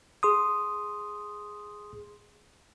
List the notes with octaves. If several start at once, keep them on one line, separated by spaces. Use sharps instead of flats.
G#4 C6 D#6